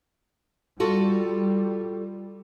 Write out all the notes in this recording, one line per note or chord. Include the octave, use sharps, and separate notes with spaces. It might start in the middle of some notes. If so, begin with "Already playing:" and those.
G3 F4 F#4 A4